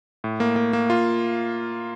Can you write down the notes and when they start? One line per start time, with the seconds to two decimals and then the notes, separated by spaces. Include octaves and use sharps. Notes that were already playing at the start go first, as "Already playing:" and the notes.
0.24 A2
0.40 A#3
0.56 A#3
0.73 A#3
0.90 F4